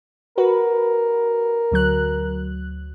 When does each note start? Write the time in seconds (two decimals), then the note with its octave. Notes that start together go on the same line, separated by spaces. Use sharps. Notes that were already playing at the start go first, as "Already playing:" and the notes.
0.38 F#4 A#4 B4
1.71 D2 F#3 F#6